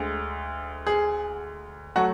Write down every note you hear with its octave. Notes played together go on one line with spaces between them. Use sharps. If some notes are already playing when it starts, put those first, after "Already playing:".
Already playing: D2 D3 G#3
G#4
F#3 A3 F#4